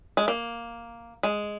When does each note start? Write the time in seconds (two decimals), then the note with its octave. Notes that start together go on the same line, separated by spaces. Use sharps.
0.17 G#3
0.28 A#3
1.23 G#3